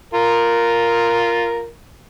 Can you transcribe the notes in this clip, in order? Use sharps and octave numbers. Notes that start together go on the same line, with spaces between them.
F4 A#4